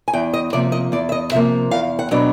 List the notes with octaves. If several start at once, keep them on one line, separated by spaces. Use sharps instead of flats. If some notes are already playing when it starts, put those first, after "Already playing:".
G#5
E2 G5
D#5
C3 F3 A#3 D5
D#5
E2 D5
E5
D#5
C3 F3 A#3 E5
E2 F5
F#5
B2 F#3 B3 D4